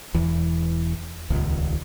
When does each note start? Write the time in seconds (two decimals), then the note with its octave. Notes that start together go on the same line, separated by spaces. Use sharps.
0.15 E1 E2 E3
1.30 D#1 C#2